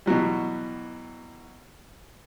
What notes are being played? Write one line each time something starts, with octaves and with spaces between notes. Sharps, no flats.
B2 E3 F#3 G3